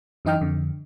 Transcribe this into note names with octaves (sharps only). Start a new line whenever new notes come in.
F#2 E3 D#4 D#5 G5 F6
F2 D3